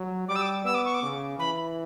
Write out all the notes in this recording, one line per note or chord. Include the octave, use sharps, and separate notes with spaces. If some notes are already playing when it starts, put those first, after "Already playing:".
Already playing: F#3
G3 D6
E6
D6
B3 E6
D6
C#6
D6
C#3
E3 B5